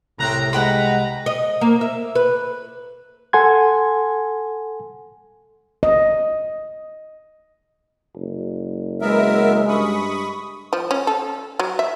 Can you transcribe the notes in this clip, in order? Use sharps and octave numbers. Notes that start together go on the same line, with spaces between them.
C2 A2 C4 A#5 F#6
G#3 B4 F#5 G5 A#5 B5
D#5
A#3
E5
B4
A4 F#5 G#5 C6 G#6
D#5
F#1
G#3 B3 A#4 E5
G2 B5 C#6 D#6
F3
C#4
A4
F#3
E5